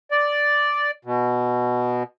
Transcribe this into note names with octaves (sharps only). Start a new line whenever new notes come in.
D5
B2